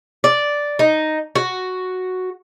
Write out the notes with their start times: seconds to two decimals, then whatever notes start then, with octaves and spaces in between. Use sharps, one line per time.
0.24 D5
0.79 D#4
1.35 F#4